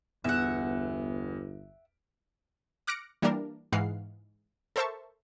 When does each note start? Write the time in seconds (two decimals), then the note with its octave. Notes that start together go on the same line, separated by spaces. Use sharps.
0.24 G1 E2 E5 F#5
2.87 D6 F6 F#6 A#6 C#7 D7
3.22 E3 G3 A#3 D4 A#4
3.72 G#2 E3 G#3 F5 F#5 C7
4.76 A4 A#4 C5 E5 A5 C#6